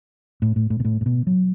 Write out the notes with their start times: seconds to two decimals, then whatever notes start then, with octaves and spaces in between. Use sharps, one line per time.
0.42 A2
0.56 A2
0.70 A2
0.80 B2
0.85 A2
1.01 A2
1.06 B2
1.27 F#3